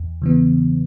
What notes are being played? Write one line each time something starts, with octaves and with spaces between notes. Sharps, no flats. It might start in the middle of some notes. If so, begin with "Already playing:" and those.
Already playing: E2
C#3 E3 B3